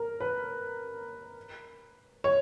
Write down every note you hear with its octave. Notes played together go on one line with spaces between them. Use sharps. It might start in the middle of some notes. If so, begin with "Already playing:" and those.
Already playing: A#4
B4
C#5